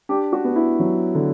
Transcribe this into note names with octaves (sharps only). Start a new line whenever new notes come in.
D4 G4
F#4
B3
E4
F#3
D3